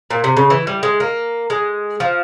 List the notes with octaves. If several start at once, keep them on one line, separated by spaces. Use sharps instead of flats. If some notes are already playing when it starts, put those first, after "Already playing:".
A#2
C3
C#3
E3
G3
G#3
A#3
G#3
F3